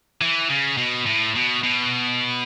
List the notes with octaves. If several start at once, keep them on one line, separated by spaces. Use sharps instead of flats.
E3
C#3
B2
A2
B2
B2